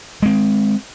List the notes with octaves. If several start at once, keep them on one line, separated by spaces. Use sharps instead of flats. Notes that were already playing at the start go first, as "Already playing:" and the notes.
G#3 C4